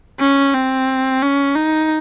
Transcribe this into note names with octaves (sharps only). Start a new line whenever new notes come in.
C#4
C4
C#4
D#4